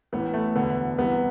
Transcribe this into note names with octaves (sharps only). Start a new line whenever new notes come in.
A1 A2 E3 B3
A3
E1 D2 D3 B3
C2 C3 E3 B3